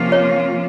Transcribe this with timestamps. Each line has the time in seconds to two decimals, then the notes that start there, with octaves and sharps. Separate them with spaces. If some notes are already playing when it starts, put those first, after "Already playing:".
Already playing: C3 F3 A#3 C#4 F4
0.12 C#5